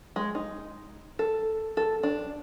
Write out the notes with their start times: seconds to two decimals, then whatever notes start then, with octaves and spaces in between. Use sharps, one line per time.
0.16 G#3
0.35 D#4
1.19 A4
1.77 A4
2.03 D4